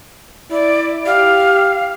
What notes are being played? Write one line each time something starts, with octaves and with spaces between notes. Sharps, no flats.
E4 D5
G4 F5